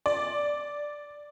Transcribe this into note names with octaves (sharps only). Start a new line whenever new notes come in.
D5